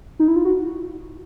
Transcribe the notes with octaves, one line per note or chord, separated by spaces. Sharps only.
D#4
E4
F4
F#4